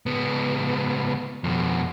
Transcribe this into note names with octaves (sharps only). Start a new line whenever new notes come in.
C#2 B3
F2 B2